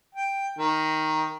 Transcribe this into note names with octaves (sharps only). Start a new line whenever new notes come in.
G5
D#3